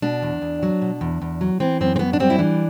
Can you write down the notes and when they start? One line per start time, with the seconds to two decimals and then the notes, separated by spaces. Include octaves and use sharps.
0.02 B2 D4
0.22 E2
0.42 E2
0.63 F#3
0.82 B2
1.01 E2
1.22 E2
1.41 F#3
1.60 E3 C4
1.81 F#2 C4
1.96 C4
1.99 F#2 B3
2.13 D4
2.20 G3 C4
2.30 E4
2.39 E3 D4